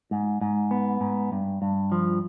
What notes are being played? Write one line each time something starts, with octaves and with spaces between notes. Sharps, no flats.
G#2
G#2
B3
G#2
G2
G2
F3